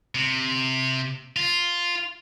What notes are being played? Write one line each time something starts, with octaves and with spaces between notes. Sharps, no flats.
C3
F4